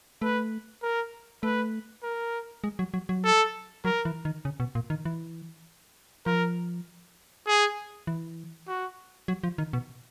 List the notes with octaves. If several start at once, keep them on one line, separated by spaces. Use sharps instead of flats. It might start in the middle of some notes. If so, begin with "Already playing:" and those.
A3 B4
A#4
A3 B4
A#4
G#3
F#3
F#3
F#3
A4
F#3 A#4
E3
D#3
C#3
B2
A#2
D#3
E3
F3 A#4
G#4
E3
F#4
F#3
F3
D#3
B2